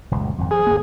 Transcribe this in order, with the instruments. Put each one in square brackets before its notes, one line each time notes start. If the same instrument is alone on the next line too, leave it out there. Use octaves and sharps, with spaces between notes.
[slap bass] D#1 C#2 F#2
G#1 F2
[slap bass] F3 [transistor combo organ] G#4
[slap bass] G1 D2 A#3